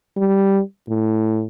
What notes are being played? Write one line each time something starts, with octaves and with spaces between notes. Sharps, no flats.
G3
A2